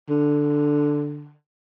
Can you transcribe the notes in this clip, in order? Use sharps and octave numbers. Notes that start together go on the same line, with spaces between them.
D3